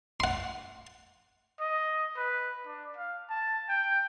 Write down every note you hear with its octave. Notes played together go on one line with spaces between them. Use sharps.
F#5 C6
D#5
B4
D4
F5
A5
G5